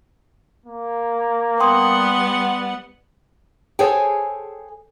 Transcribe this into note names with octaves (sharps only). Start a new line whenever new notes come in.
A#3
G3 B3 F#5 G5 C6 D#6
G#4 A4 C5 C#5 G5 G#5